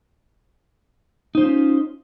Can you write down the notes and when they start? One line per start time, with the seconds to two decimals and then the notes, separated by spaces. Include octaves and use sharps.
1.35 D#4
1.37 C5
1.40 F4
1.43 C#4